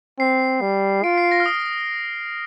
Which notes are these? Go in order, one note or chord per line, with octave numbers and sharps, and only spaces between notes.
C4 C7
G3
F4 D7
C7
A#6
F6
D#6